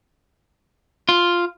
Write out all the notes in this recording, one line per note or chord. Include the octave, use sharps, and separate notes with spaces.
F4